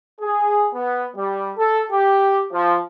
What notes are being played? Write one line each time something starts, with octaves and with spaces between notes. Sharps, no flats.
G#4
B3
G3
A4
G4
F3